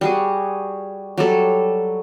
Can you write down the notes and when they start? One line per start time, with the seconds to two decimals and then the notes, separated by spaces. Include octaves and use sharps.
0.01 G3 F#4 G#4
1.18 F#3 G3 A4